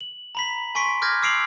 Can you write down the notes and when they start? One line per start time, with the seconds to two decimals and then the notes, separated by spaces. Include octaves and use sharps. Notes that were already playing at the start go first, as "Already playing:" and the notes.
0.01 F#7
0.35 A#5 B5 B6
0.75 G#5 C6 C#6 B6 D7
1.02 D6 F6 G6 G#6 A#6
1.22 D6 E6 C7 D7 F7 F#7